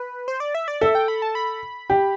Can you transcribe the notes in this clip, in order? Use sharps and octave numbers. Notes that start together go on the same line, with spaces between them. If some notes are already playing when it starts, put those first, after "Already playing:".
Already playing: B4
C5
D5
E5
D5
A4 E5
G5
B5
A5
B5
G4